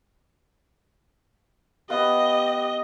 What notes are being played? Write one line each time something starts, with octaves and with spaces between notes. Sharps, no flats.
B3 G4 D#5 F5